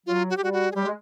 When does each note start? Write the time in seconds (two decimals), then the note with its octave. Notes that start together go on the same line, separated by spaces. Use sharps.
0.06 F#3 F4
0.30 F#4
0.37 G4
0.42 G3 F#4
0.53 F#4
0.72 G#4
0.75 G3 G4
0.84 G#3